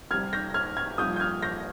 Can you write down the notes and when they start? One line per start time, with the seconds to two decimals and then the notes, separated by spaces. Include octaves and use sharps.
0.11 C2 C3 G3 F6 G#6
0.33 G6 A#6
0.54 F6 G#6
0.77 F6 G#6
0.98 C2 A#2 F3 D#6 G6
1.16 G6
1.20 F6 G#6
1.42 G6 A#6